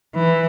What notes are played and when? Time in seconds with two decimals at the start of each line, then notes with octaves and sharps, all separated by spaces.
0.15 E3